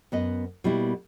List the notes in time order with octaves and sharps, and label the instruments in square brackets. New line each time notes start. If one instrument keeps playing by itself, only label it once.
[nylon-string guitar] F#2 B3 D#5
B2 G3 A#3 B3 E4